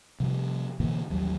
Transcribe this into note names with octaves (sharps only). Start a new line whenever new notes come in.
C3 F3 G3
B2 D3 E3 A#3
A1 D#2 F#3 G3